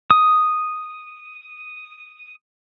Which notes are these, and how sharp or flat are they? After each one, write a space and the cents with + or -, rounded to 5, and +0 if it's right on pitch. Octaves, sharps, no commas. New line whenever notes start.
D#6 -5